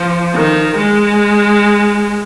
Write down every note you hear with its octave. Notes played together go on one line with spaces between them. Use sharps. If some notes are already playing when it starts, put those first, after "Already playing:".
Already playing: F3
D#3
G#3